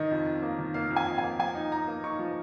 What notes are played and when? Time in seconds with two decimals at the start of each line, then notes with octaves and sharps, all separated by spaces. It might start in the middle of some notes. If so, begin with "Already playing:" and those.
Already playing: D#3 D#5
0.11 F2
0.26 F2
0.42 A#3
0.59 D#3
0.74 A#3 F5
0.90 F2
0.96 G#5
1.06 F2
1.18 G#5
1.23 A#3
1.39 F3 G#5
1.55 D#4
1.72 D#4 A#5
1.87 A#3
2.03 D#4 C#6
2.19 F3